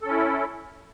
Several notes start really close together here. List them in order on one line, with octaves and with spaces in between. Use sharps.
A4 C#4 E4